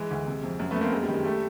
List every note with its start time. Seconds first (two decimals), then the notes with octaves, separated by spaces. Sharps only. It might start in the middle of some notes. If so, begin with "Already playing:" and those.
Already playing: E3 G#3
0.11 D2
0.27 C3
0.43 F2
0.59 F#2
0.71 A3 B3
0.76 F#2 A#3 C4
0.92 F#2 G#3
1.03 G3
1.08 D#3
1.14 G#3
1.24 G3 A3